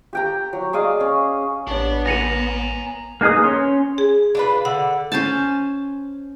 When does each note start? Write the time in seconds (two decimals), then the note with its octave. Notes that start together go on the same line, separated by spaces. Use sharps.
0.13 G4 G5 A#5
0.53 F#3
0.73 G#4 D5 D#5 F5
1.00 C#4
1.67 A1 B3 D4 C#5
2.06 G#5 A#5 A#6 C#7 D#7
3.21 A#3 D#4 G#4 B4 D#6
3.44 C#4 C#5 C6
3.98 G#4
4.35 D4 F4 B4
4.65 D3 F#5
5.12 C#4 C5 G#5 A5